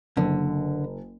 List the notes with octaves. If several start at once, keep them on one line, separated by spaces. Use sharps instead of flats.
F#1 D3